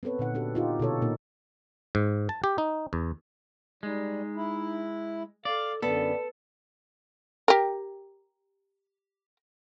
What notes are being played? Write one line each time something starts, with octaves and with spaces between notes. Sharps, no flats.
B3 C4 A4 B4 C#5
A#2 D3 D#4 F#5
D4 F#4 G4 A4
D#4 F4 G4
B2 D3 A4 C#5
A#2 A#3 D#4 A#4
G#2
A5
G4
D#4
E2
G3 G#3 D#4
E4
A4 D5 F5
F#2 D3 B3 A4 D5
G4 A#4